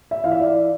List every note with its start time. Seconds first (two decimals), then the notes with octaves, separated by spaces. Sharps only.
0.11 E5
0.24 E3 F5
0.32 E5
0.40 D5